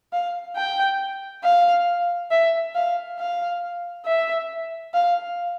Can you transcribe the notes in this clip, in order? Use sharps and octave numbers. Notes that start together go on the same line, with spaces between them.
F5
G5
F5
E5
F5
F5
E5
F5